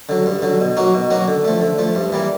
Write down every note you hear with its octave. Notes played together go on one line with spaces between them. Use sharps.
D3 F#3
G2
D3 F#3
B2
F#3 A#3 D#4 F#4
B2
F#3 A#3 D#4 F#4
D3
F3 A3
D3
F3 A3
G2
E3 G3 A#3